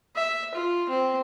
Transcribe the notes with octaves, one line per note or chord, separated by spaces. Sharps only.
E5
F4
C4